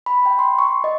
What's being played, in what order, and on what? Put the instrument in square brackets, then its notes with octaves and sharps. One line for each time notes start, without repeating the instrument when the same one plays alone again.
[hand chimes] B5
G5
C6
C#6
D#5